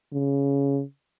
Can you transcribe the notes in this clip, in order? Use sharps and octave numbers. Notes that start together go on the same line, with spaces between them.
C#3